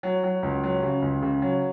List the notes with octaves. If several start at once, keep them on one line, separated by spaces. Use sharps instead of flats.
F#3
F#3
C#2
F#3
C#3
C#2
C#3
F#3